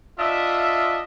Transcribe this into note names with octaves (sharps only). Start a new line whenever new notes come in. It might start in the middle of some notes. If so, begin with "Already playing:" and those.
D4 F4 D#5 E5